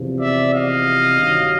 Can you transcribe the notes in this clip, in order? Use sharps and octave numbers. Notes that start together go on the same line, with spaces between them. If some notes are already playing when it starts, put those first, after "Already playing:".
Already playing: E2 C3 F3
D5 E5
D#5 F5
G2 D#3 F#3